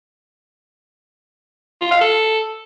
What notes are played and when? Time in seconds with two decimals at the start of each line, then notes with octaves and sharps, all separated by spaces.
1.81 F4
1.91 F5
2.01 A4